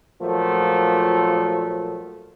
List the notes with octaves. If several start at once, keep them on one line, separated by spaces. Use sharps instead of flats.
A#2 F3 F#3 A3